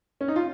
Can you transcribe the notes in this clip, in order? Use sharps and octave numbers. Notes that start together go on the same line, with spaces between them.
C#4
D#4
F4